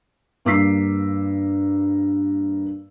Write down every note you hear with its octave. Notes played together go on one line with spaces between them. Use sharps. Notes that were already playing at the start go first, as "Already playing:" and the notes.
G2 A#3 D6 E6 B6 C7